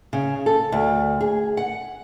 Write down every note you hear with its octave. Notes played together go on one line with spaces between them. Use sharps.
C#3
A4
D2
G#4
F#5